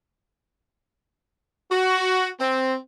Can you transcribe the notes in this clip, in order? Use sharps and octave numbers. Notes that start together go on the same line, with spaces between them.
F#4
C4